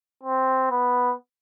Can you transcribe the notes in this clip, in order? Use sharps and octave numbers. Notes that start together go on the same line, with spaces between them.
C4
B3